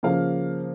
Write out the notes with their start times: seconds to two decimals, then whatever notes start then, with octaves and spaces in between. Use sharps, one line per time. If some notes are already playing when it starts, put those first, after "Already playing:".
0.03 C#3 F3 A#3 F5